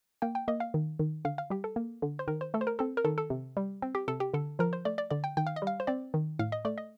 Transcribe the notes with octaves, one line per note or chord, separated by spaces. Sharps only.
A#3 G5
G5
A#3 D#5
F5
D#3
D#3
D3 F5
F5
G3 G4
A4
A#3
D3
C5
D#3 A#4
C5
A3 A4
C5
A#4
C4 A4
A#4
D#3 A4
A4
C3
G3
C4
G4
C3 A4
G4
D3 A4
F3 A#4
C5
A3 D5
D5
D3 D5
G5
D#3 G5
F5
D#5
G3 F5
C5
C4 D5
D#3
A2 F5
D#5
A3 D5
D#5